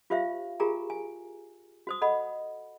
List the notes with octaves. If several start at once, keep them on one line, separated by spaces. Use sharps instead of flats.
F4 G4 C5 E5 F5
F4 G4 G#4 A#4 G#5 A#5
G#5
F#4 C5 D#6
A4 D#5 F#5 B5